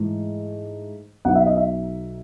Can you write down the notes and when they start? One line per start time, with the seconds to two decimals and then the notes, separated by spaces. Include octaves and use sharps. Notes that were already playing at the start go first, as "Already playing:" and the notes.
Already playing: G#2 E3 A3
1.25 B1 B2 F#3 B3 D#4 F#5
1.35 E5
1.46 D#5
1.57 E5